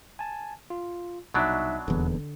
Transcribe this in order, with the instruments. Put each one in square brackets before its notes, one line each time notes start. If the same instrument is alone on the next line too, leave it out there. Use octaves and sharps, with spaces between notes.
[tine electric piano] G#5 A5
F4
[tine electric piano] C2 D#4 E5 [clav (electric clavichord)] B2 F#3 D4
[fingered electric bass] D#1 E2 [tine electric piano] D3